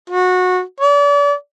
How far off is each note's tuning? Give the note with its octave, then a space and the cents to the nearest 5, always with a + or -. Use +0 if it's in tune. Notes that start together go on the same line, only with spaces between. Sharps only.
F#4 -20
D5 -40